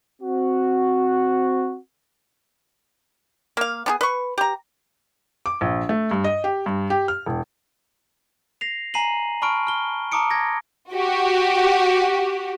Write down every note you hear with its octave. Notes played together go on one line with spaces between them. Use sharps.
C4 F#4
A#3 F5
B3 D4 G#4
B4 C#6
G4 A#5
D6
A#1
A3
G2
D#5
G4
G2
G4
F6
E1
A#6 C7 F7
G#5 A#5 C7 D#7 F#7
A5 B5 C#6 F6 D7
F6 G7
A5 A#5 D6 D#6 C#7 D7
G#6 A#6
F#4 G4